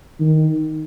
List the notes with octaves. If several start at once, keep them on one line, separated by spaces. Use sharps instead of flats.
D#3